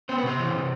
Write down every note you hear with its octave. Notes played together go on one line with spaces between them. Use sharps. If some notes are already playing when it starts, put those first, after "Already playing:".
B3 C5
B4
C3 C5
E3
C3